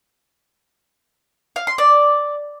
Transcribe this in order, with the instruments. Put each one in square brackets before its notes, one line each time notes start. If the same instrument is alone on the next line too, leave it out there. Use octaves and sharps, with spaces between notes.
[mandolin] F5
C6
D5